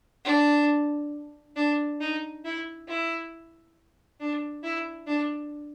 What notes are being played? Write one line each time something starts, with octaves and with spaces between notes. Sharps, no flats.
D4
D4
D#4
E4
E4
D4
E4
D4